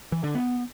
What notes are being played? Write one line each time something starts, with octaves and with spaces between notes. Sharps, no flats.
E3
D3
B3